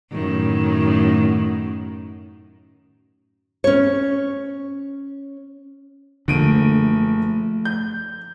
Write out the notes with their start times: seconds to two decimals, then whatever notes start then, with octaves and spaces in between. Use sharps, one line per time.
0.12 F#2 A2 D#3
3.64 C#4 C#5
6.28 F#1 D3 F3 A3 D7 D#7
7.65 G6